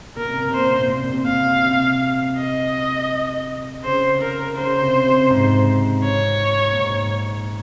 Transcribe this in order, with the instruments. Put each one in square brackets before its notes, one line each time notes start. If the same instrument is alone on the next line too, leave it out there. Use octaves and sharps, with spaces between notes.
[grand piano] A#2 [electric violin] A#4
[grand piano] C3
A#2
[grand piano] C3 [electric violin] C5
[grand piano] A#2
C3
A#2
C3
A#2
C3
[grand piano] A#2 [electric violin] F5
[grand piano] C3
[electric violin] D#5
[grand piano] C#3 [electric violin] C5
[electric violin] A#4
[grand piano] C#3 [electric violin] C5
[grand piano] C3
C3
G#2
[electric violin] C#5
[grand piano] A#2
G#2